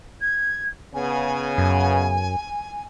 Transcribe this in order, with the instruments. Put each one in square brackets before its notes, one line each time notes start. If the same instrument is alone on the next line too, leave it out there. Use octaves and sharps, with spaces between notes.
[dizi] G#6
[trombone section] C#3 B3 [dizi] G#5
[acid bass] F#2